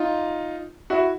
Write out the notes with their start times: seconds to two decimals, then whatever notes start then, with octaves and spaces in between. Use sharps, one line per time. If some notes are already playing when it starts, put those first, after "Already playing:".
Already playing: D#4 F4
0.90 E4 F#4